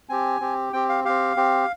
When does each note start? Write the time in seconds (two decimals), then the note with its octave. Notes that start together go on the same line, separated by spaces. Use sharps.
0.09 C4 G4 G#5
0.40 C4 G4
0.73 C4 G4 G5
0.89 F5
1.04 C4 G4 F5
1.36 C4 G4